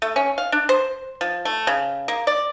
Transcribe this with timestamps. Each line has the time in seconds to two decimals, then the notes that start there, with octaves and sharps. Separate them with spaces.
0.02 A3
0.16 C#4
0.38 F5
0.52 D4
0.69 C5
1.21 F3
1.45 A3
1.67 C#3
2.08 A#3
2.27 D5